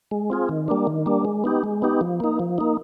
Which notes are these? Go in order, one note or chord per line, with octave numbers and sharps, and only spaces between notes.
G#3
C4 F4 G#4
D#3
G3 A#3 D4
D#3
G3 A#3 D4
G#3
B3 D#4 G4
G#3
B3 D#4 G4
F3
A#3 D#4
F3
A#3 D#4